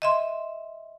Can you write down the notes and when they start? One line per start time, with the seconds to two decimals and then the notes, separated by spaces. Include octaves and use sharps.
0.02 D#5 E5 C6